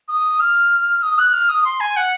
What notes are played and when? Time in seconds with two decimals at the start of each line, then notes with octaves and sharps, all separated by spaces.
0.08 D#6
0.40 F6
1.03 D#6
1.18 F#6
1.33 F6
1.49 D#6
1.65 C6
1.80 G#5
1.96 F#5